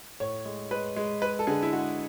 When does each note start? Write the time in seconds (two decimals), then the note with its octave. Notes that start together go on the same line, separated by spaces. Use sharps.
0.20 A2 C#5
0.45 G#3
0.71 G#3 B4
0.96 G#3
1.22 G#3 B4
1.39 A4
1.47 D3 G#4
1.63 E4
1.72 G#3 F#4